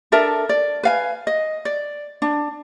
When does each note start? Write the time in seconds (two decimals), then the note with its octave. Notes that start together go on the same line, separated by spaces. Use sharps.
0.12 D4 A4 A#4 E5
0.49 D5
0.83 B4 F5 G#5
1.27 D#5
1.65 D5
2.22 D4